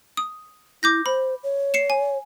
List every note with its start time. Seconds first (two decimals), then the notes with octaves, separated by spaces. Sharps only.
0.17 D#6
0.83 E4 D6 G6 A#6
1.06 C5 B5
1.43 C#5
1.74 C7 C#7 E7
1.90 G#5